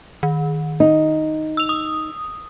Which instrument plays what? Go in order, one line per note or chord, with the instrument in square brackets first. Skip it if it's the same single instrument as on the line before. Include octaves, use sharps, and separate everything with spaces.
[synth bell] D#3
[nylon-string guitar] D#4
[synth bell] E6 F7
D#6